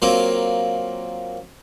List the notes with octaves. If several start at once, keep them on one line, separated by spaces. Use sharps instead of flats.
F#3 A#3 C4 F4